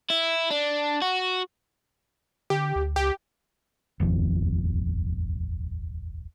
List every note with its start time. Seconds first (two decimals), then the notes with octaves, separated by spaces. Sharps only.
0.10 E4
0.51 D4
1.02 F#4
2.50 D3 G4
2.76 D2
2.96 C#2 G4
4.00 D#1 G#1 F2